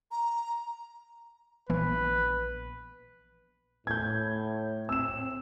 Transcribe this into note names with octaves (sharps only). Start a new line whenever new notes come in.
A#5
A#1 E3 B3 B4
A2 G6 G#6
C4 E6 E7